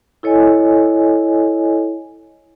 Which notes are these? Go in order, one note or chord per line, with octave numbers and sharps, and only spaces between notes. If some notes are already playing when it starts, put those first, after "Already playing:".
E4 A4 C#5 D#5 G#5